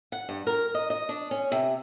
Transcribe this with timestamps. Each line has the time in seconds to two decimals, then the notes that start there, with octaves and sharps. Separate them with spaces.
0.12 F#5
0.29 G2
0.47 A#4
0.74 D#5
0.90 D#5
1.09 D4
1.31 C#4
1.52 C3